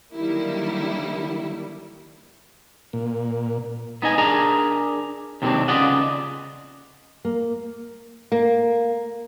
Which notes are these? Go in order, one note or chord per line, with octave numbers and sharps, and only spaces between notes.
D3 D#3 F#3 G3 A#3 E4
A#2
B3 D#4 D#5 G#5
D4 G#4 A#4 G#5 A#5
D#2 C3 D#3 F#3 C4 D4
C#3 B3 F4 D5 D#5 F#5
A#3
A#3